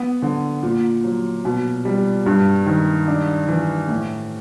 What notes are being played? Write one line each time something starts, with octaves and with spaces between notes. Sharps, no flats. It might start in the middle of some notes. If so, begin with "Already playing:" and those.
Already playing: B3
D3
A#2
F#3
B2
G3
G2
D#3
D4
E3
A2